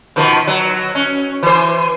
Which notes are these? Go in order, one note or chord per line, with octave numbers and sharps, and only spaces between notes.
B2 D#3 F3
F#3
C#4
E3 C5